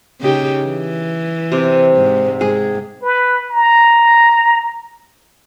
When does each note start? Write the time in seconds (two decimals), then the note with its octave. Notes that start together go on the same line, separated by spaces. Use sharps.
0.21 C#3 D#4 G4
0.64 E3
1.52 C3 D5
1.96 G#2
2.41 G#2 G#4
3.02 B4
3.51 A#5